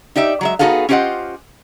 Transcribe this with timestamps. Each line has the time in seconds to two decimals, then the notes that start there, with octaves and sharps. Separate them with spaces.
0.16 D#4 G4 D5 E5
0.41 F#3 G#3 E5
0.59 B3 D#4 F#4 G#4 A4 F5
0.89 C#4 F4 G4 C5 D#5 F#5